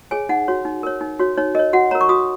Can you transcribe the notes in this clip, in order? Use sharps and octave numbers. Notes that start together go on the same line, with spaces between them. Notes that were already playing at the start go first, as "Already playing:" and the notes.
G#4 C#5 G#5
D#4 F#5
F#4 C#5
D#4
A#4 C#5
D#4
F#4 C#5
D#4 C#5
A#4 C#5 D#5
F#4 F#5
A#4 C#5 A#5
C#6
F#4 D#6